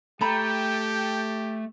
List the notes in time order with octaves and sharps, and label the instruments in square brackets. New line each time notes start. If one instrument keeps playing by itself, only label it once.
[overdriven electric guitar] A3 [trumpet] G4 [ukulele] C#5 A#5 B5 [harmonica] G5